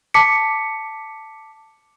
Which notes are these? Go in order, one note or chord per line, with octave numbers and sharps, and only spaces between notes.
A5 D6 B6 C#7